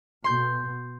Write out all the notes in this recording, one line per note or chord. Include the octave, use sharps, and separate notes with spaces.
B2 C6 G6